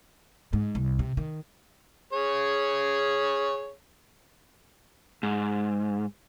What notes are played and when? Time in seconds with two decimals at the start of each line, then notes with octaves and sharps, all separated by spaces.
0.53 G#2
0.75 C2
0.99 C3
1.17 D#3
2.13 G#4 C#5
5.23 G#2